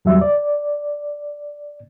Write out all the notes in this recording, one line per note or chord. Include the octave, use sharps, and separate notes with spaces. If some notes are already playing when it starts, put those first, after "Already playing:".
E2 F#3 G3 E5
D5